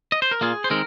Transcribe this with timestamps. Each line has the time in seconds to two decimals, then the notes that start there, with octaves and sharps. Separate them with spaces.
0.12 D#5
0.22 C5
0.31 A#4
0.41 A#2 A#3 F4 G#4
0.64 C5
0.70 D#3 G#3 C4 A#4